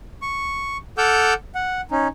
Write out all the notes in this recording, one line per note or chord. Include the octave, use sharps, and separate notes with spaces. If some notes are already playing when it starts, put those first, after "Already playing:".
C#6
A4 F#5 D6 E6 F6 G6
F#5
C#4 D#4